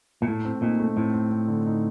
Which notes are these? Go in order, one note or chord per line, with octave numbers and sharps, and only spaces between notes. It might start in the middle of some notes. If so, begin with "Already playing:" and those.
A#2
A2 A3
C4
A#2 D#4
A3
A2 C4
C4
C4
D3
D#4